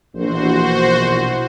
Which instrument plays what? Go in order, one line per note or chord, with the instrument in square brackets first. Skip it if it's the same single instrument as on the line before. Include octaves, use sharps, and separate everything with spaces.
[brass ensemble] A#1 [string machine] B2 E3 [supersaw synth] F#4 C5